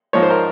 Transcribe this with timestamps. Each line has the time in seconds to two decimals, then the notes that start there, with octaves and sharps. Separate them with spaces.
0.13 G#2 F3 G#3 C#5
0.23 C5
0.30 A#4